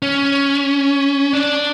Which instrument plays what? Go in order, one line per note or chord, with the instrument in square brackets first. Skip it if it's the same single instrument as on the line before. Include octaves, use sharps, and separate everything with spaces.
[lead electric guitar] C#4
D4